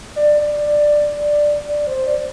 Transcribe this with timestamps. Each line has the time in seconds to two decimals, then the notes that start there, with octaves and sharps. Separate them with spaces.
0.16 D5
0.41 D5
0.67 D5
1.68 D5
1.87 C5
2.07 D5